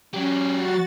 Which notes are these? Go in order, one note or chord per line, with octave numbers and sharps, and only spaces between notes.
F#3 C#4 G4
F#4 A6